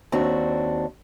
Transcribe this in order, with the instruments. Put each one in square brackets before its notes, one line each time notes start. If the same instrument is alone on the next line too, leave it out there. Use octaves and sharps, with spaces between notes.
[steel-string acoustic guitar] D#2 C4 D4 F#4